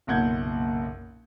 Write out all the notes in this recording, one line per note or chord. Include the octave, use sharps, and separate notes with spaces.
F#1 B1 A#2 F#5 G6 G#6